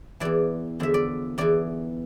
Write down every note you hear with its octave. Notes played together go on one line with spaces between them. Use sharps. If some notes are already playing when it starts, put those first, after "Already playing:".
E2 E3 D5
E2 D3 F3 E5
D5
E2 E3 D5